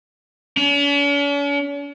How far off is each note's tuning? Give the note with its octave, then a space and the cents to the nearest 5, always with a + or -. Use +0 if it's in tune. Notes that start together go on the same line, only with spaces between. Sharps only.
C#4 +45